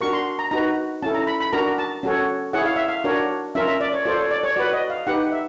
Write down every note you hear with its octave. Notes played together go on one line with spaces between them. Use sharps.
D4 F#4 A#4 C#6
C6
A#5
D#4 F#4 B4 A#5
C#4 E4 A4 A5
A#5
B5
B5
D4 F#4 A#4 A#5
A5
C#4 F#4 A4 C#5
E4 G#4 C#5 F#5
F5
E5
F5
D4 F#4 A#4 C#5
C#4 F4 A#4 E5
E5
D5
C#5
F4 A4 C5 D5
C#5
D5
C#5
F#4 B4 D5
D#5
F5
D#4 G4 B4 F#5
E5